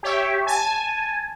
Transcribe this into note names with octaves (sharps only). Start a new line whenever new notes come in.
G4 C#5 E5
G#5 A5